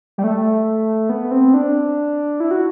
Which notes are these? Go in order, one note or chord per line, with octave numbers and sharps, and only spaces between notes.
G3
A3
B3
C4
D4
E4
F#4